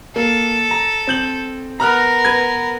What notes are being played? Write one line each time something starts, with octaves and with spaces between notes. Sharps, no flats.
A#3 A4
A#5
C4 G6 F#7
B3 A#4 A#5 F6 F#6
B4 G#6